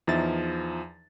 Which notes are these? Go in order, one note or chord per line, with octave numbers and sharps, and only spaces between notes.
E2 F3 D#4 E5 A6